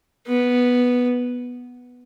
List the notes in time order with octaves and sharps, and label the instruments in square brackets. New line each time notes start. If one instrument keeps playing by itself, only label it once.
[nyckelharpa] B3